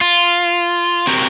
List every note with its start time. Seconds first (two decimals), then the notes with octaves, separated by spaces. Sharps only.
0.01 F4
1.07 C4 F#4 G4 A#4